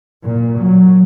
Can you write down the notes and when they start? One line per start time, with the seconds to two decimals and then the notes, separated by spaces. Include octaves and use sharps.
0.22 A#2
0.59 F#3